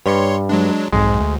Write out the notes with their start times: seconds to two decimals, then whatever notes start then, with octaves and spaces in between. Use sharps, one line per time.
0.06 G2 C#5 C6 C#7
0.49 F#3 G#3 D4
0.93 B1 F2 G#2 G#3
1.21 D2